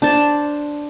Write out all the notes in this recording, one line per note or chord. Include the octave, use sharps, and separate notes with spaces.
D4 C5 A5